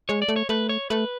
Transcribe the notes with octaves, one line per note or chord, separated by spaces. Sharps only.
G#3 C#5
D5
A3
C#5
A3 B4
C#5
A3 B4